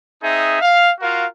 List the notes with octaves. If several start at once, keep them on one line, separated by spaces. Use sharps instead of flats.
C4 D#4 G#4 E5
F5
F4 F#4 A#4 F5